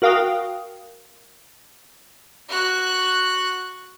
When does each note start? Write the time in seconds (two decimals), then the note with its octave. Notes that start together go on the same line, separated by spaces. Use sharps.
0.02 F#4 A#4 F5 G5 D#6
2.49 F#4 F#6